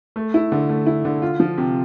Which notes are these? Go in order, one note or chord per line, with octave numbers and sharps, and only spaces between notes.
A3
E4
D3
A3
E4
D3
F4
F3
C3